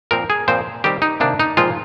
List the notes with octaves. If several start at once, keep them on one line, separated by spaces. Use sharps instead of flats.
A#2 F3 C4 A#4
G#4
A#2 F3 C4 C5
D#3 G3 C4 G4
D#4
C3 D#3 A#3 D4
D#4
A#2 F3 G#3 C4 F4